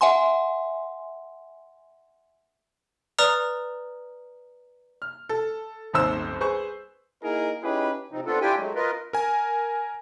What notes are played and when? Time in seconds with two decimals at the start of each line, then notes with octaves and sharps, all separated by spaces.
0.01 E5 F#5 G#5 C6
3.19 B4 D5 A#5 D#6 F6
5.02 F6
5.29 A4
5.93 D#1 G#1 D#2 C5 E6
6.40 G#4 B4 C5 C#6
7.23 A#3 D#4 E4 G#4 A#4
7.63 C#4 D#4 E4 G4 G#4 B4
8.12 C3 F3 C4 D#4
8.26 A3 B3 C4 D4 F4 A4
8.41 D4 E4 F4 G4 G5 G#5
8.57 F#3 G#3 A3
8.75 F4 A#4 B4 D#5
9.13 A#4 G#5